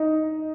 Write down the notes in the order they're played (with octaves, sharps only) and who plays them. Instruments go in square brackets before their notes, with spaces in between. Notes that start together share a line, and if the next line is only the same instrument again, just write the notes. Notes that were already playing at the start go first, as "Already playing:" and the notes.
Already playing: [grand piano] D#4